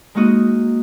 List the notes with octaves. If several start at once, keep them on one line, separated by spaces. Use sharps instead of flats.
G#3 A#3 D#4 F#4 D#5